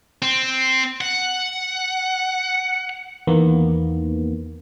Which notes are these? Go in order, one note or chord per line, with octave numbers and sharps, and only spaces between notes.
C4
F#5
E2 D#3 A#3 B3